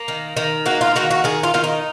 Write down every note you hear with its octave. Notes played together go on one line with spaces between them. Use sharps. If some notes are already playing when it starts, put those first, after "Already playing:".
Already playing: A#3
D#3
D#3
A#3 F#4
F4
D#3 F#4
F#4
D#3 G#4
F4
D#3 F4
D#4